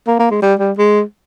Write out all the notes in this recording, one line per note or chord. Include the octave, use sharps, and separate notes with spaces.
A#3
A#3
G#3
G3
G3
G#3